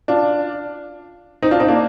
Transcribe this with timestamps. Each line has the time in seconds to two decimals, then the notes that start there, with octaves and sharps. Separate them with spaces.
0.08 D4 F4
1.42 C4 D#4
1.51 D4 F4
1.60 C4 D#4
1.68 A#3 D4